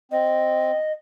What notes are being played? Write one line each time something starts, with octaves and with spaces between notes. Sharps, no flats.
C4 D#5